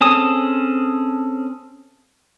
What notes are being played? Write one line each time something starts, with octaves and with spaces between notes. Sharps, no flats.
C4 C#4 G#4 A4 D#6